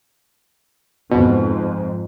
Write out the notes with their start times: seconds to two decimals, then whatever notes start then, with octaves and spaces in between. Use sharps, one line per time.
1.11 F2 G#2 B2